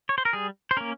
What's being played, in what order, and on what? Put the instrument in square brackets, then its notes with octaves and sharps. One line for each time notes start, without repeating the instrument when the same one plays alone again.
[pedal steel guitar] C#5
C5
A#4
G3 G#4
C5
A#3 C#4 A#4